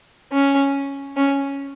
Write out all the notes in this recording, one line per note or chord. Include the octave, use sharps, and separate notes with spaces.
C#4
C#4